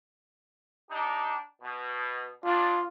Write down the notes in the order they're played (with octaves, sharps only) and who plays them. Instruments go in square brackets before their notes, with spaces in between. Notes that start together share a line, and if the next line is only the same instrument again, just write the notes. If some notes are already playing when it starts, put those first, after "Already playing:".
[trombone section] D4 D#4 G4
B2
[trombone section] G#2 D4 [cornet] F4